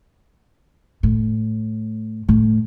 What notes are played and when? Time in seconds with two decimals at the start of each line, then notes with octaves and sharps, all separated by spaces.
1.03 A2
2.29 A2